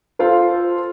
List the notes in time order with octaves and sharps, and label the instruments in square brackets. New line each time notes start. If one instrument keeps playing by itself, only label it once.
[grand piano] F4 A4 C5